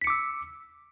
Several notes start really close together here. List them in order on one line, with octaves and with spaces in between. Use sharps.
B6 C#7 D6 E6